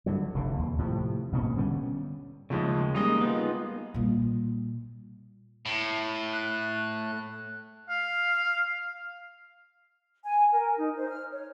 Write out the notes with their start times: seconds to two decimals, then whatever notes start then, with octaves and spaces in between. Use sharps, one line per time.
0.06 G2 D3 F#3
0.34 F1 A2 D3
0.57 D#2
0.78 A2 C3 F3
1.32 G#1 B2 A#3 C#4
1.57 D3 G3 B3 C#4
2.50 D#2 C#3 F3 G#3 A3
2.95 G3 G#3 A#3 D#4 D#5
3.21 B3 D#4 F4
3.94 A#2 G3
5.66 A2
6.32 F#6
7.90 F5
10.25 G#5
10.53 A#4
10.77 D#4
10.97 C5
11.10 F6
11.32 C#5